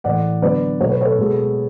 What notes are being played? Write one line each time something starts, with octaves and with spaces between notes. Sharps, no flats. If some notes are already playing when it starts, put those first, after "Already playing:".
A2 E3 A3 D5 F#5
D3 F#3 B3 B4 D5
B2 F#3 A3 C#5
B4
A4 C#5
B2 G#3 B3